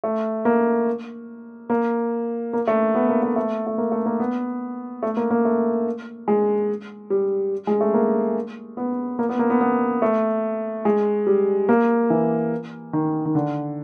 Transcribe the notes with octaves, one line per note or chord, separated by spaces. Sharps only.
A3
A#3
A#3
A#3
A3
B3
A#3
A3
A3
A3
A#3
A3
A#3
B3
A3
A#3
A#3
A3
G#3
G3
G#3
A3
A#3
B3
A#3
B3
A#3
B3
B3
A3
G#3
G3
A#3
E3
D#3
D#3
D3